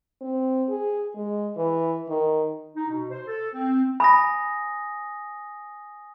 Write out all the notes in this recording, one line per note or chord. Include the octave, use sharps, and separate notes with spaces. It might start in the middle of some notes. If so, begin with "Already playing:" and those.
C4
G#4
G#3
E3
D#3
D#4
B2
C5
A4
C4
G#5 B5 D#6 A#6